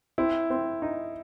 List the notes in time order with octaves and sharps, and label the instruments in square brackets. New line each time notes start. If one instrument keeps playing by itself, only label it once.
[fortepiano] C4 [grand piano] E4
[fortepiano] C4
D#4